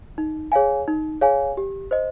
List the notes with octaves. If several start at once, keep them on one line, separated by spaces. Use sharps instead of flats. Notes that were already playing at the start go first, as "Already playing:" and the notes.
D#4
G#4 C#5 F5 G#5
D#4
G#4 C#5 F5 G#5
G4
C5 D#5